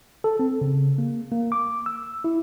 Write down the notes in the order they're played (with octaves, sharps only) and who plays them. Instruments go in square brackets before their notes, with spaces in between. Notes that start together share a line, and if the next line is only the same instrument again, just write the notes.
[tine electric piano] A4
C4
C#3
A#3
A#3
D6
E6
E4